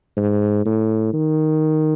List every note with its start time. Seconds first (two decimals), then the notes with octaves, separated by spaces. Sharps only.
0.17 G#2
0.65 A2
1.13 D#3